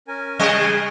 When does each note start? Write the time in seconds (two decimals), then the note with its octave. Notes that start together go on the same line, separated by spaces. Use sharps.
0.08 C#4 A#4 G#5
0.39 C#3 G3 G#4 D#5 G#5 F#6